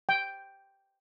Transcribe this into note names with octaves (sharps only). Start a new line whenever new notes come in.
G5